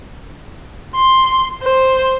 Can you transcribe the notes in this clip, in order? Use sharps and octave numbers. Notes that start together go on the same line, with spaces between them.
C6
C5